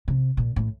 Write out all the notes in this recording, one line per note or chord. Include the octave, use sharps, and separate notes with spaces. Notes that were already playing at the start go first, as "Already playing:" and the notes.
C3
A#2
A2